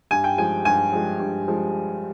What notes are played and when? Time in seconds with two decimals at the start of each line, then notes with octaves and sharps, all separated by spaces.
0.11 G2 G#5
0.24 G5
0.38 F3 G#3 G#5
0.65 G2 G#5
0.93 F3 G#3
1.20 G2
1.48 F3 G#3